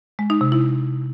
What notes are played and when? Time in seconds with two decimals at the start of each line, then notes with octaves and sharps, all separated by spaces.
0.19 G#3
0.30 D#4
0.41 C3
0.52 E4